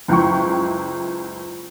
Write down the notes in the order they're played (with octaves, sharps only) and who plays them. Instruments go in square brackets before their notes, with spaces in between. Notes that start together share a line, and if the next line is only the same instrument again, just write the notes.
[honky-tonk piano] F#1 C#2 E4 G5 C#6